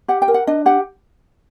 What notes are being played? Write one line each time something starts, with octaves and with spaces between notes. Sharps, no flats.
G4 F#5
G5
A#4
F#5
D4 D#5
G4 F#5